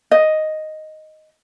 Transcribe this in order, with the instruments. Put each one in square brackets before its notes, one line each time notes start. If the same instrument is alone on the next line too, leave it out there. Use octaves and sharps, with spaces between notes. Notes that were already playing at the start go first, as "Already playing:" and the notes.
[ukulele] D#5